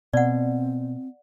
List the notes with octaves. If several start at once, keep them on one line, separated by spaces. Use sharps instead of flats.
B2 C4 D5 F#5